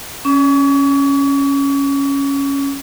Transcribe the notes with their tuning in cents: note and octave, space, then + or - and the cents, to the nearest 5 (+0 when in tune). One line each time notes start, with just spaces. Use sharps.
C#4 +0 C#6 +40